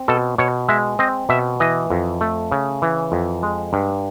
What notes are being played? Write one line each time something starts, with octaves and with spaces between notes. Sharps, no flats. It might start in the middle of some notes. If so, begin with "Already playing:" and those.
Already playing: C4
B2 A4
B2 C#5
G#3 E5
C4 D#5
B2 E5
E3 D#5
F2
A3
C#3
E3
F2
G#3
G2